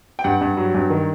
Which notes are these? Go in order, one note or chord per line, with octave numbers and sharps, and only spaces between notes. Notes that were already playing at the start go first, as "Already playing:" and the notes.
G5
G2 F#5
G2
F#3
G2
D#3